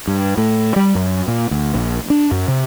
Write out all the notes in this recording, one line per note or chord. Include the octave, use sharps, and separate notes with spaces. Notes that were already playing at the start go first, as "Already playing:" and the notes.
G2
A2
G3
F#2
A#2
D2
A#1
D4
F#2
C3